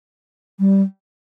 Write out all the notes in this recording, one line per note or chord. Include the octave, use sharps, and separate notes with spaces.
G3